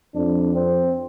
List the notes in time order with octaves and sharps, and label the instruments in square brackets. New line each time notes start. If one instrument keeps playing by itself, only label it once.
[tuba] F2 [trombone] D4
[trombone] C4